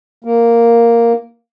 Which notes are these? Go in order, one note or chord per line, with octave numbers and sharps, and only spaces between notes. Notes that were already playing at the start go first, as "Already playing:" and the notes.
A#3